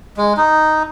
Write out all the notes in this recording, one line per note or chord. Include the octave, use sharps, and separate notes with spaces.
G#3
D#4